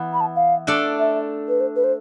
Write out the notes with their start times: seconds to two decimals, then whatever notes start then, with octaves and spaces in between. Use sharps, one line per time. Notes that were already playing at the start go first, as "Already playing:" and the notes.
Already playing: E3 B3 E4
0.13 B5
0.21 A5
0.36 F5
0.67 A3 D4 A4 D5
0.99 E5
1.49 B4
1.60 C5
1.76 B4
1.84 C5